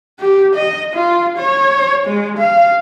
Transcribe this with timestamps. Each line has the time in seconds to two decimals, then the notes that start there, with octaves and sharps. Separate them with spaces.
0.19 G4
0.55 D#5
0.94 F4
1.38 C#5
2.06 G#3
2.38 F5